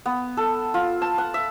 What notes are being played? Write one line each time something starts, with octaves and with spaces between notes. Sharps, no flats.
B3
A4
F4
A5
F#5
E5